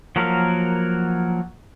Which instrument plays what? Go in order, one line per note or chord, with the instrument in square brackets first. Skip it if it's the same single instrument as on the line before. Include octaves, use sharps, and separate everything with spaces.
[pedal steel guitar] F3 F#3 A#3 F#4 A#4